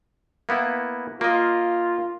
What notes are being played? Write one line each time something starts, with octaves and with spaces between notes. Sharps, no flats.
A#3 B3 E4
A#3 F4 D#5